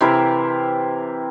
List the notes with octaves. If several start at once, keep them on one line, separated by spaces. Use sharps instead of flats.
C3 E3 E4 A#4